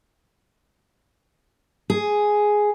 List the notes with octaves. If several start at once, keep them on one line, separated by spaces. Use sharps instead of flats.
G#4